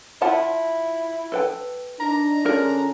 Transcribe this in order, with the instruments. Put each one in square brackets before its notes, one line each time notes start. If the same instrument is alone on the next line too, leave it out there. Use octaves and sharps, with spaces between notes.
[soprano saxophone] E4 [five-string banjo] F4 F#5 A5
[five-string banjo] A4 B4 G5
[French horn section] D4 D#4 [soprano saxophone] A#5
[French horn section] D3 C#4 G#4 [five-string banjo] D4 F4 A#4